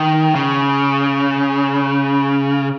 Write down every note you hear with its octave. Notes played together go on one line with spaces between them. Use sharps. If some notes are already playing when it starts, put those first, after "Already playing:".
Already playing: D#3
C#3